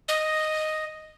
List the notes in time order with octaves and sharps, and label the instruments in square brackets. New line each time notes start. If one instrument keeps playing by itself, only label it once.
[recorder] D#5